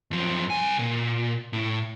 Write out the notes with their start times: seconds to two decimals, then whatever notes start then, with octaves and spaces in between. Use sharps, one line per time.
0.11 F#2 F3
0.50 C2 G#5
0.79 A#2
1.53 A2